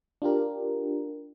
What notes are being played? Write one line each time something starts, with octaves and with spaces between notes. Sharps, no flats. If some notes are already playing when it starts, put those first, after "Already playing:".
D4 F4 G4 A#4